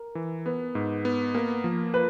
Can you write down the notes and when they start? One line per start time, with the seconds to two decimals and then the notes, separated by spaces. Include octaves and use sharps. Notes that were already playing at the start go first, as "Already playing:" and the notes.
Already playing: A#4
0.15 E3
0.46 B3 B4
0.75 G#2
1.05 B3
1.34 A#3 A#4
1.64 F3
1.94 B4